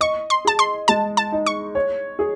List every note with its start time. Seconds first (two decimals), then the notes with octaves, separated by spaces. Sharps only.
0.01 D#5 C#6
0.30 C6
0.45 G#4 A5
0.59 C6
0.88 G#3 A5
1.17 A5
1.32 D#4
1.46 C#6
1.75 C#5
2.19 G#4